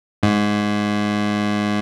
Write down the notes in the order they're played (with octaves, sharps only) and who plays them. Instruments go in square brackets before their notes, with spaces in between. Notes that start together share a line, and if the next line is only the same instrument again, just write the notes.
[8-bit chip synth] G#2